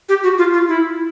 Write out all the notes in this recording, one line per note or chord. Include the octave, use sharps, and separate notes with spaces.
G4
F#4
F4
F4
E4